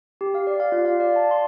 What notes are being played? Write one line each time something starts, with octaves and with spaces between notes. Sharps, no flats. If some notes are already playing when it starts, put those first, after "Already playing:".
G4
F5
D5
F5
F4
F5
D5
A5
C6